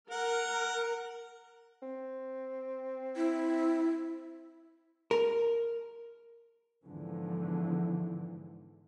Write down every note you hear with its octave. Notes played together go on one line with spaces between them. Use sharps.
A#4 F#5
C4
E4
A#4
E2 G#2 D3 E3 F3